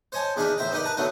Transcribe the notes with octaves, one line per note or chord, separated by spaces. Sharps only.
C5 C#5 D#5 G#5 A5
E2 D4 D#4 G#4 F5 B5
A1 C5 E5 G5 A#5
B3 D#4 G4 A#4 D5
B4 A5 A#5
B2 F#3 A3 B3 D4 D#4